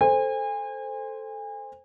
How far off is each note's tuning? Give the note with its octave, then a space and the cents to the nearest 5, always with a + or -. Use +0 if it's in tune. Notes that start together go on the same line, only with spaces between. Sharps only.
A4 +0 C5 +0 G#5 -35